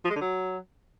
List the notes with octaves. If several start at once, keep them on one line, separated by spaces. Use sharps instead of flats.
F3
G#3
D3
F#3